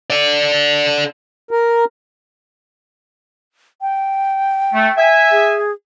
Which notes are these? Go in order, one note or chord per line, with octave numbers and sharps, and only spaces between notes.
A4 D5
A#4
G5
A3
E5 G#5
G#4